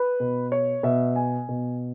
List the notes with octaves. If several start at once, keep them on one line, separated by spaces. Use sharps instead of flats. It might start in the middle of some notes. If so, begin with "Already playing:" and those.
Already playing: B4
B2
C#5
B2 E5
G#5
B2